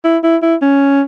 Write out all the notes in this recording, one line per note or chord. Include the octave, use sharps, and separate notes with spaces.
E4
E4
E4
C#4